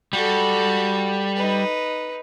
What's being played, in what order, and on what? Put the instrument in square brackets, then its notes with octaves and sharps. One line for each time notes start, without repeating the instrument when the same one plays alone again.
[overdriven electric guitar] G3 [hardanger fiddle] F#4 A4
[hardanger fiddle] D#4 B4